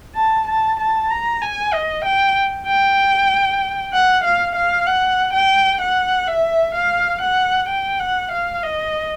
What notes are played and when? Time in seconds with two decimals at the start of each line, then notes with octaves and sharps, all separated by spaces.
0.16 A5
0.48 A5
0.79 A5
1.10 A#5
1.42 G#5
1.73 D#5
2.05 G5
2.67 G5
3.93 F#5
4.24 F5
4.55 F5
4.86 F#5
5.33 G5
5.81 F#5
6.27 E5
6.74 F5
7.22 F#5
7.69 G5
8.00 F#5
8.32 F5
8.63 D#5